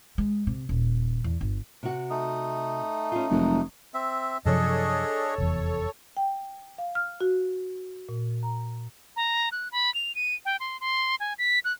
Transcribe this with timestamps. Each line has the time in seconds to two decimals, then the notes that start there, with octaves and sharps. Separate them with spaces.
0.18 G#3
0.47 C3
0.69 D#1
1.24 E2
1.41 G1
1.83 C3 F#4
2.10 A3 D#4
3.12 C#4 F4
3.30 F1 D#2 F#3 G#3
3.94 C4 E5
4.45 F#2 C3 F3 D4 G#4 A4 C#5 D#5
5.38 F1 E2
6.17 G5
6.78 F5
6.95 F6
7.20 F#4
8.09 A#2
8.43 A#5
9.16 A#5
9.52 F#6
9.72 B5
9.95 F7
10.15 D#7
10.45 G5
10.60 C6
10.81 C6
11.20 G#5
11.38 B6
11.65 F#6